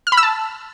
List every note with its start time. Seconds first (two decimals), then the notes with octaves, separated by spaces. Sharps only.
0.07 F6
0.12 B5
0.17 E6
0.23 A5